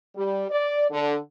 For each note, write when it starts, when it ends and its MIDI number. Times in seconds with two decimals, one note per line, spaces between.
0.16 0.45 55
0.50 0.86 74
0.90 1.17 50